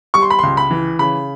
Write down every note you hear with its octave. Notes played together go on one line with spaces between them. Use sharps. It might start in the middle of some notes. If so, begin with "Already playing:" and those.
G3 C#6
C6
B5
C#2 C6
B5
E3
C#3 B5